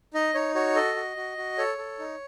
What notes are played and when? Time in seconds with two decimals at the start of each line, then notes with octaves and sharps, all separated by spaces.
0.14 D#4 D#5
0.35 D#4 C#5
0.55 F#4 C#5
0.76 A4 D#5
0.96 F#4
1.17 F#4
1.37 F#4
1.58 A4 C#5
1.78 A4
1.99 D#4